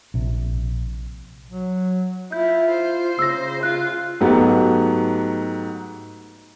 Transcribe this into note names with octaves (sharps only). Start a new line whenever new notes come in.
A#1 C3
F#3
E4 F4 G6
C5
C#3 E6 A#6
F4 F#6
G#2 F#3 A3 B3 G4